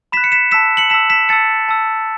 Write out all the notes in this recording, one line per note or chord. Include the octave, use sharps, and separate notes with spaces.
B5 F#6 B6 E7
C#7
B6 E7
A5 E6 B6 E7
C#7 F#7
A5 E6 B6 E7
B6 E7
A5 E6 A6 C#7
A5 E6